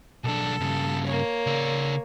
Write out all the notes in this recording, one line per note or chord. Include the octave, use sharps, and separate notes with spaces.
B1 D4 A4
G2 C#3
A#3 C#5
C#3 D5